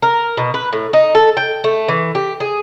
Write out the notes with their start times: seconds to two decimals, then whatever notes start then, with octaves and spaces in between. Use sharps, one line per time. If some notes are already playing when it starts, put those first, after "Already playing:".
0.02 A#4
0.37 B2
0.54 B4
0.73 A2
0.93 D#4
1.15 A4
1.37 G5
1.64 A3
1.88 E3
2.15 G4
2.40 G#4